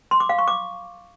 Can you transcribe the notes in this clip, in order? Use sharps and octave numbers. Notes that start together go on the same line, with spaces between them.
C6
D6
F5
C#6
D6